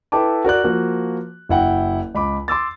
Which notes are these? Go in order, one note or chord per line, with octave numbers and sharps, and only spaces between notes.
E4 A4 B4 G5 A5 D6
F#4 A#4 D5 F#6
F3 A#3 F#4
F#1 E4 F#5 G5
C#2 B5 D6
C6 D6 E6 A6